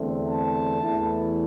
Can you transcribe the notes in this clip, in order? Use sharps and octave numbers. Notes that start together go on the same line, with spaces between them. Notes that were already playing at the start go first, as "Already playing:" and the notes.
Already playing: E2 D3 A3 C4
A5
E2 E3 A3 E4